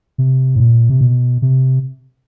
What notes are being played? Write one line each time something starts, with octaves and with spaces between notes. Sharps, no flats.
C3
A2
A#2
C3
B2
C3